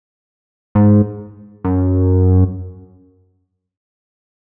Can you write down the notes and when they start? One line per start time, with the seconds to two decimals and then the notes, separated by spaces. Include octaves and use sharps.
0.75 G#2
1.64 F#2